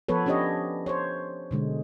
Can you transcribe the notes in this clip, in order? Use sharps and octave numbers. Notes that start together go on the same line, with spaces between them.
F3 B3 A4 B4 C#5
C#4 D4 G4 C#5 D#5
C5 C#5
B2 D3 G#3